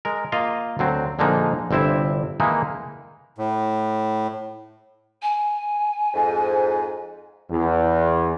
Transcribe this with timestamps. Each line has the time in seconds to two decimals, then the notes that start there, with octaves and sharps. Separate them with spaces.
0.05 G#3 A#4
0.32 A#3 F4 D#5 F5
0.79 D2 F#3 C4
1.19 A#1 D3 F3 G#3 A#3 D#4
1.71 G1 C3 C4 E4 E5
2.40 D#3 E3 G#3 A#3 D#4 E4
3.38 A2
5.22 G#5
6.14 F2 G#2
7.50 E2